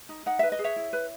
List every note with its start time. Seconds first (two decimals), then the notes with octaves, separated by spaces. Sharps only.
0.09 D#4
0.26 D#4 F#5
0.39 B4 E5
0.52 D#5
0.59 G#4
0.64 C#5 E5
0.76 E4
0.93 B4